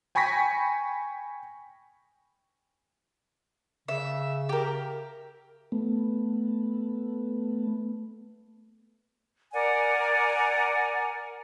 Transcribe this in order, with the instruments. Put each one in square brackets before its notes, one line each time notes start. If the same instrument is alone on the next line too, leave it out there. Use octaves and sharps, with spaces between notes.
[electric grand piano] G5 G#5 B5 C#6 A#6 B6
[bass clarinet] C#3 [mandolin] E5
[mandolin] G4 A#4
[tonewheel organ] A3 B3
[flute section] A#4 D5 F#5 G#5